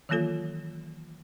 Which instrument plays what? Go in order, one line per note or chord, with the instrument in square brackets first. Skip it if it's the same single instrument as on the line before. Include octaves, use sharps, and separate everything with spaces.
[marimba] D#3 E3 F#3 A#3 F4 A4